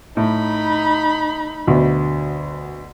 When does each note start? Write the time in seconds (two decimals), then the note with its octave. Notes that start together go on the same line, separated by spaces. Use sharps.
0.17 A2 D#4 B5
1.67 D2 B2